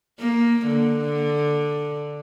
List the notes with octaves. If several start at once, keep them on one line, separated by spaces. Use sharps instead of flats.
A#3
D3